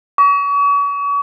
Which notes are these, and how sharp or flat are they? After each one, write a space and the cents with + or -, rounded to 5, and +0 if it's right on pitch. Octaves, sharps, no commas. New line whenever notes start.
C#6 +40